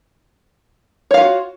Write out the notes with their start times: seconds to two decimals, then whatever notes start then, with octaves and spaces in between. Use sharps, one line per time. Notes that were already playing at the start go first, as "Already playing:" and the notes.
1.11 C#5
1.14 F5
1.17 F4
1.21 F#4